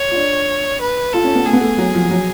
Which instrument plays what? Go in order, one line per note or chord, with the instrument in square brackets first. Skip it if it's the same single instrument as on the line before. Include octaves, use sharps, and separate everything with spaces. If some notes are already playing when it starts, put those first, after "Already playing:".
Already playing: [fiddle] C#5
[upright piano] F4
D4
[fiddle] B4
[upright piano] F4 [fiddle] A4
[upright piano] C#4
B3
[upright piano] A3 [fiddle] G#4
[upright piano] B3
A3
F#3
F3
F#3